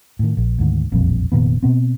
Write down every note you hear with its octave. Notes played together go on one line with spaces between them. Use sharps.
A2 D#3
A#1
D2 G#2 D#3
E1 A#1 F2 G3
F1 A#2 D#3 B3
B2 B3 C4